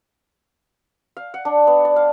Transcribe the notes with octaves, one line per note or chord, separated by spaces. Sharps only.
F5
F#5
D4
B3
D5
F5